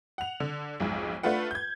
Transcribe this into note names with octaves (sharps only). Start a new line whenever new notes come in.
F#5 F7
D3
B1 F2 G#2
A3 D4 F4 B4 F#5
G6 G#6